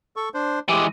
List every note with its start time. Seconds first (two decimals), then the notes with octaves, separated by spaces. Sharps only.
0.16 A4 C#6
0.34 D4 C5
0.69 E3 G#3 G4